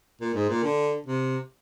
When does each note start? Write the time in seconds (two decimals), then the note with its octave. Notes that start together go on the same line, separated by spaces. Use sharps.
0.21 A#2
0.35 G#2
0.49 A#2
0.63 D3
1.07 C3